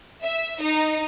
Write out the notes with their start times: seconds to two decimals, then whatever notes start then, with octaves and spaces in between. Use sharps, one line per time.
0.23 E5
0.62 D#4